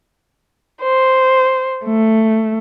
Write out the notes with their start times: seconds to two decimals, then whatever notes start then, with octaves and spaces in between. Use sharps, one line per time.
0.82 C5
1.85 A3